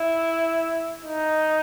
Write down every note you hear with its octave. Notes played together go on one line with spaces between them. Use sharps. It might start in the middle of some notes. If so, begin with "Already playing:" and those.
Already playing: E4
D#4